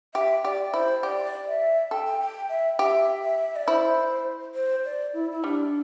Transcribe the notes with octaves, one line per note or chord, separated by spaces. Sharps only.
G4 E5
G4 D5
E4 C5
G4 D5
E5
A4 G5
G5
G5
E5
G4 E5
E5
D5
E4 C5
C5
D5
E4
E4
G3 D4